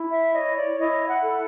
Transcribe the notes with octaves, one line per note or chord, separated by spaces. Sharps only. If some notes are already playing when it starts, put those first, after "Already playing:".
Already playing: E4
E5
C#5 D#5
D5
E4 D#5
F#5
A4